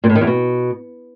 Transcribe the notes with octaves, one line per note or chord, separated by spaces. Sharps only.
A#2
A2
D#3
E2
B2